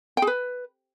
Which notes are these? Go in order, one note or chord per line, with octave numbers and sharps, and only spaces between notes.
G5
G#4
B4